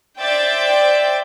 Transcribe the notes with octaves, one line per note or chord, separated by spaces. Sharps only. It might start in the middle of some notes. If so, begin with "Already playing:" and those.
C5 D5 E5 G5 G6 A6